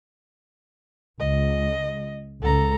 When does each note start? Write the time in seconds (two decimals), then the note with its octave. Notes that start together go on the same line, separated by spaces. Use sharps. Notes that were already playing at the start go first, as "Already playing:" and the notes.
1.20 C#2 D#5
2.42 C#2 A4 A#5